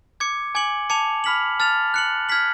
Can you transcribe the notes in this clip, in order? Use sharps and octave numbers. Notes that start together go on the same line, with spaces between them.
D6 G#6 C#7
G#5 D6 G#6 C#7 F#7
A5 D6 G#6 C#7 F7
B5 F6 B6 F#7
A5 F6 A6 F7
F#6 C#7 F#7
F6 G#6 B6 F#7